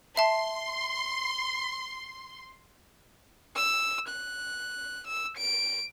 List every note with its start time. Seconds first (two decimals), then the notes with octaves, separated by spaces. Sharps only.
0.17 E5 A5 C6
3.56 E6
4.09 F#6
5.08 E6
5.38 D7